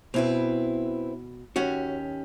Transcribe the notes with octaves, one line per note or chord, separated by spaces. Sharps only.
B2 C4 E4 B4
D#2 C#4 F#4 G4